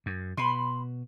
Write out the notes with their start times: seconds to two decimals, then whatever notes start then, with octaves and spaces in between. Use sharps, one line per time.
0.06 F#2
0.38 B2 B5 C6